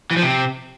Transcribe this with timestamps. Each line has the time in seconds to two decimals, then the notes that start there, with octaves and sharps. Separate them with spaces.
0.11 E3
0.17 F3
0.23 C3